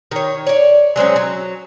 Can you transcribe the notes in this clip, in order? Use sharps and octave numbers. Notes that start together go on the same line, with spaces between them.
D#3 C#5
C#5 D5
F#3 G#3 C4 C#4
F#3